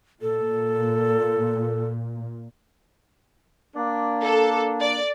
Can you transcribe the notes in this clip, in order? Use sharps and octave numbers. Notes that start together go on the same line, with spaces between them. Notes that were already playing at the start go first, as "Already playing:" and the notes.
A#2 A4
A#3 D4
A4
D5